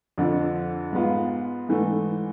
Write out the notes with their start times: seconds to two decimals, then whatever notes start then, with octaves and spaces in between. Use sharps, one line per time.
0.18 F2 D3 F3
0.93 G#2 G#3 B3 F4
1.69 G#2 E3 A3